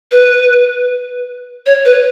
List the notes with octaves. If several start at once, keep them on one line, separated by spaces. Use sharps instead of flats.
B4
C#5
B4